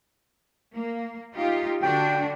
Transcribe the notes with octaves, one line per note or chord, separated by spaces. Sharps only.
A#3
D#4 F4 G4
D3 D4 F#4 G5